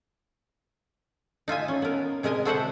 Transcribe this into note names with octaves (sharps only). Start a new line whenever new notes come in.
D#4 F4 E5 G#5
C#4
B3 A#4
C3 G#3 A#4 D#5 G#5
F#4 A4 C5 D#5 E5 F#5